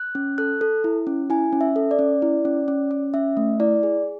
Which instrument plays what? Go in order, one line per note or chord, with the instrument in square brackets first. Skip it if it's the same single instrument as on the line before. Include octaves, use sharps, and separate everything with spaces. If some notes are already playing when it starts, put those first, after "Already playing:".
Already playing: [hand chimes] F#6
C#4
A4 F#6
A4
E4
C#4
E4 G#5
C#4
E5
A4
D5
C#4
E4
C#4
C#4
C#4
C#4 E5
A3
E4 D5
G#4